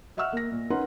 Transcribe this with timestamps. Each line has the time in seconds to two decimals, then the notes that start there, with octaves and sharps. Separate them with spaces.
0.17 D#5 E5 F#5 C#6 E6 F6
0.33 A#3 A#6
0.52 A#2
0.70 C#4 D#4 A#4 B4 F#5 C6